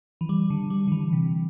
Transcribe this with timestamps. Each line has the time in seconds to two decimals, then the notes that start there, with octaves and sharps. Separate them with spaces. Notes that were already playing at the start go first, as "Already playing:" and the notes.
0.21 E3
0.29 G3
0.50 D3
0.70 G3
0.88 D3
0.92 E3
1.13 C3